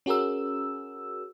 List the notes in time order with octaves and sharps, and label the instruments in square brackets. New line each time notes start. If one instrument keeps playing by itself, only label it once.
[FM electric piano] C#4 F#4 G#4 A#4 E6